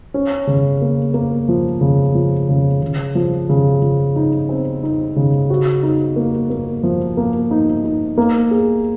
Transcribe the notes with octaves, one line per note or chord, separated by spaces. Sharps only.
C#4
C#3
A#3
A#3
F3
C#3
F3
C#3
C#3
F3
C#3
F3
D#4
C4
D#4
C#3
F#4
D#4
A#3
A#3
F3
A#3
D#4
D#4
A#3
G#4